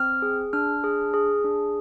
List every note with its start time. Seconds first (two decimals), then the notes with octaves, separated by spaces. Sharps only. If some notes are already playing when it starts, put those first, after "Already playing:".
Already playing: C4 F6
0.22 G#4
0.53 D4 F6
0.84 G#4
1.14 G#4
1.44 D4